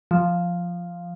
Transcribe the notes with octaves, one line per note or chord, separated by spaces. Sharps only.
F3